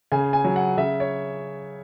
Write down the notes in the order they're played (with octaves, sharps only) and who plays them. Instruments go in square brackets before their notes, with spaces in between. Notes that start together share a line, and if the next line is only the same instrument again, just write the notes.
[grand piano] C#3 G#5
G#5
F#3
F#5
C#3 E5
C#5